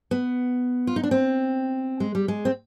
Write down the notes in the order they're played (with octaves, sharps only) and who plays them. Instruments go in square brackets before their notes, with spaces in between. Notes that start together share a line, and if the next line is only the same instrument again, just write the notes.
[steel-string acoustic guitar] B3
F4
D#4
D4
C4
G#3
G3
G#3
C4